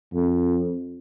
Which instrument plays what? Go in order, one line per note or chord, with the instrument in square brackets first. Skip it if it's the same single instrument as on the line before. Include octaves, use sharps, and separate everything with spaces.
[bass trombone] F2